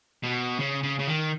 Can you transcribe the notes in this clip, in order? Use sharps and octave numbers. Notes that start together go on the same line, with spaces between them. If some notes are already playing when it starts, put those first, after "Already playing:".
B2
C#3
C#3
C#3
D#3